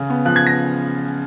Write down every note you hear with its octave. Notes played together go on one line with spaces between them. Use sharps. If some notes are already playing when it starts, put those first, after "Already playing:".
Already playing: C#3
B3
F3 F#6
G#6
A#6